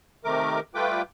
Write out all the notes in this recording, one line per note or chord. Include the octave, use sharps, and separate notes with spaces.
C3 D#3 A3 A#4 D6
G3 A3 F4 B4 G5 D6